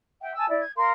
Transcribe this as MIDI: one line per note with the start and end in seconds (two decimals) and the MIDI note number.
0.21 0.35 76
0.21 0.35 78
0.21 0.35 79
0.35 0.47 80
0.35 0.47 81
0.35 0.47 88
0.48 0.60 64
0.48 0.60 74
0.62 0.72 92
0.76 0.92 70
0.76 0.92 77
0.76 0.92 84